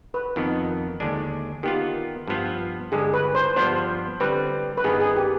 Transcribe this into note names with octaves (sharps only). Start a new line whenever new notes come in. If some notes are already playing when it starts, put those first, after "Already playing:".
B4
F2 D#3 B3
D#2 D3 G#3 D4
D#3 B3 F4 G4
G2 F3 B3 F4
G2 D3 G#3 G#4
B4
C5
G2 F3 B3 D4 C5
D3 G3 C4 B4
B4
G2 D#3 B3 D#4 G#4
G#4
G4